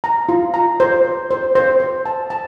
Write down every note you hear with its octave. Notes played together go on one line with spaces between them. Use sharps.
A#5
F4
A#5
C5
C5
C5
C5
C5
A5
A5